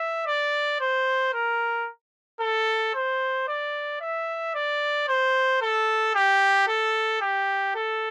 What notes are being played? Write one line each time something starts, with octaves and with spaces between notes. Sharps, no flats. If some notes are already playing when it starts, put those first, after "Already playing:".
Already playing: E5
D5
C5
A#4
A4
C5
D5
E5
D5
C5
A4
G4
A4
G4
A4